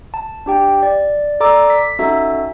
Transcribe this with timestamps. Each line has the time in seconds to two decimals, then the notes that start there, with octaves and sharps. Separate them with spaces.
0.14 A5
0.46 D4 G4 G5
0.83 D5
1.40 A4 D5 A#5 D6 E6
1.70 B6
1.99 C#4 D#4 F#4 A4 E5